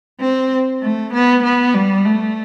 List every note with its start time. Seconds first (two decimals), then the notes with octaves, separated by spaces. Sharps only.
0.21 C4
0.82 A3
1.14 B3
1.44 B3
1.75 G3
2.06 A3